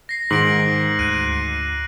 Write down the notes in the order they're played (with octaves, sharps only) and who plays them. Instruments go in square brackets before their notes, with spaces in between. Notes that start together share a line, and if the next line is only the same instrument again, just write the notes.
[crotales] A#6 C7
[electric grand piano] G#2 [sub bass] D#3 [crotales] A#6 D7 F#7
[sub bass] D2 [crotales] F#6 D7 D#7